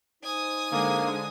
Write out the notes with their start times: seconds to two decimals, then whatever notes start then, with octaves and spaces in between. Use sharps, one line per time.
0.24 D#4 C5 G#5 D#6
0.72 D3 G#3 A#3